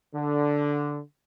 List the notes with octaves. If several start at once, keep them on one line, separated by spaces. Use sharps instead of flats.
D3